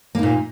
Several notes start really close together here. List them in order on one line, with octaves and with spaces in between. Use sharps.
A#3 D#4 A#2